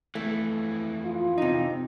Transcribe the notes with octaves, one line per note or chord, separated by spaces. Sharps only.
F2 E3 A3
F4
C3 D#4